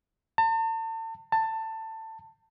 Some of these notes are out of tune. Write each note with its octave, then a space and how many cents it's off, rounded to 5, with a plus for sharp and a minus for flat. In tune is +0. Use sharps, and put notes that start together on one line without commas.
A5 +40
A5 +20